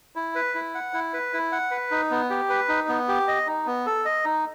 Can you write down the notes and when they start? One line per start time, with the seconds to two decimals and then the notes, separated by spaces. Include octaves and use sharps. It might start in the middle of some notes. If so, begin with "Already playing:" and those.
0.16 E4
0.35 B4
0.55 E4
0.75 F#5
0.94 E4
1.14 B4
1.33 E4
1.52 F#5
1.71 B4
1.91 D#4
2.11 B3
2.30 G4
2.50 B4
2.69 D#4
2.88 B3
3.08 G4
3.28 D#5
3.47 D#4
3.66 B3
3.86 A4
4.05 D#5
4.25 D#4